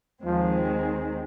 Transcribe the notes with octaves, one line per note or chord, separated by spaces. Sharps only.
D#2 D#3 F3 G#3 C4